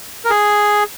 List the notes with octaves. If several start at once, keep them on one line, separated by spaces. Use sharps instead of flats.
A#4
G#4